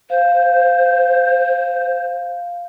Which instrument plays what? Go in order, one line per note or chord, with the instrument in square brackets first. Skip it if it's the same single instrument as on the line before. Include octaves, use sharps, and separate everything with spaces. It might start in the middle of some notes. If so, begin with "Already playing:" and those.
[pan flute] C5 [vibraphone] F5